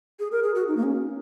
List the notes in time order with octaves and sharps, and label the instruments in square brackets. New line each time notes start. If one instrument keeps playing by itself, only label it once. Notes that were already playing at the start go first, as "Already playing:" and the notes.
[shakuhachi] G#4
A#4
G#4
F#4
D#4
A#3
C#4